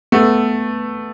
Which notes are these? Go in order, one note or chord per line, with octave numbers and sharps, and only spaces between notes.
A3 B3